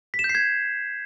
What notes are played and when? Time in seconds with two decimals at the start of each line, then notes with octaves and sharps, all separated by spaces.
0.14 B6
0.19 E7
0.24 G6
0.29 C7
0.35 G#6